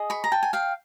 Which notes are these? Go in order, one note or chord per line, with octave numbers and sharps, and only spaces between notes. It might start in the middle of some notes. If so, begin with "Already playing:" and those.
Already playing: G#4 D#5
B5 C#6
A#5
G5 A5
G#5
F5 G5